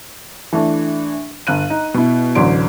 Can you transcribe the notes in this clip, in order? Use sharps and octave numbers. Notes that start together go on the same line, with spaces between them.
E3 A3 D4
G1 F5 F#6 D#7
D#4
B2 E4
A1 D2 F#3 D5 C6 D7